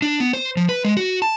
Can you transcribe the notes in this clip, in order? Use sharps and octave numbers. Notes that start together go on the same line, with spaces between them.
D4
B3
C5
F3
B4
G#3
F#4
A5